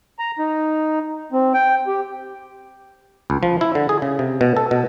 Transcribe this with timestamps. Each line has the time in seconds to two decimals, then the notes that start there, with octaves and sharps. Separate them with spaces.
0.19 A#5
0.39 D#4
1.32 C4
1.54 G5
1.87 G4
3.30 C#2
3.43 F3
3.61 E4
3.75 D3
3.89 G#4
4.02 C#3
4.19 C3
4.41 B2
4.57 A4
4.71 B2